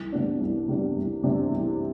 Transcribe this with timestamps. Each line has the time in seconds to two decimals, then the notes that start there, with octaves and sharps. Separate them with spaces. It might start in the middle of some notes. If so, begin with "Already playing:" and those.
Already playing: C2
0.12 C3 G3 B3 D4
0.40 C2
0.68 C3 G3 B3 D4
0.96 C2
1.23 C3 G3 B3 D4
1.52 C2